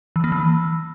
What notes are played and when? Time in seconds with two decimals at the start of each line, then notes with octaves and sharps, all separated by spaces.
0.16 E3
0.24 A#3
0.32 E3